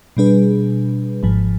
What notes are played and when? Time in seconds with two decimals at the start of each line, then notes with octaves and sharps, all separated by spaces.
0.17 B2 G3 D4 G#4 B4
1.23 G#1 G#2 F3